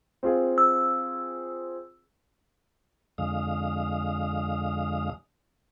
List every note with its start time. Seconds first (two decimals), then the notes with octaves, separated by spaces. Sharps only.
0.23 C4 F4 G#4
0.58 E6
3.18 F2 D3 G#3 F5 D#6